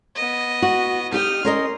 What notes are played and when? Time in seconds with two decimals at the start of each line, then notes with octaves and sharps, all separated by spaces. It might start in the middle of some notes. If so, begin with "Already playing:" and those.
0.15 B3 D#5
0.62 F#4
1.12 D#4 G4 G5 D#6 F6
1.45 C#4 A#4 D#5 C6